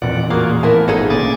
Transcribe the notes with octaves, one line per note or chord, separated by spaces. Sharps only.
E1 A1 F2 A#2 D5 F#5
A1 A#3 F4 F#4 G#4
F3 A3 B3 E4 A#4 G#5
G#1 D#4 G#4 A4
F1 A#2 C#3 G#5 D6 A6